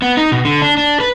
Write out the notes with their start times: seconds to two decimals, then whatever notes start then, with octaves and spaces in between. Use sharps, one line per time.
0.02 B3
0.17 D#4
0.32 B2
0.45 D3
0.62 D4
0.77 D4
1.00 B4